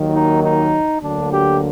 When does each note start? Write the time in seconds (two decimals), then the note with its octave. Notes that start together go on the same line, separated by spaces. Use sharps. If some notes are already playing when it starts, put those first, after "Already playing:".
Already playing: D#2 D#3 F#3 A#3
0.15 D#4
0.44 D#4
1.02 D2 D3 F#3 A#3 D4
1.32 G4